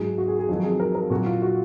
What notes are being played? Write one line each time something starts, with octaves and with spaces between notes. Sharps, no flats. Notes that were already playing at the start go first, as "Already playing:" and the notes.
Already playing: G#2 F#3 G#4
F#4
G#4
G#4
F2 D#3 F#3
G#4
A#4
A#4
A#2 F#3 F#4
F4
F#4